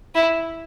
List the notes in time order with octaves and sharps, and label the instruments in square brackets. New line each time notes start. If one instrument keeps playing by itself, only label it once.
[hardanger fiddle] E4